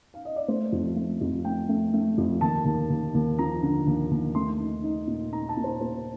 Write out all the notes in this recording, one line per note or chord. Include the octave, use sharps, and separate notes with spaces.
F5
D#5
D5
A3 C5
F2
A3
F2
A3 G5
A3
A3
F2
D#2 A5
D#2
D#2
D#2
F3 A#5
D3
D#2
D#2
A3 C6
D#4
D#4
A#2
D#4 A#5
A5
A#2
C5
A#2 C5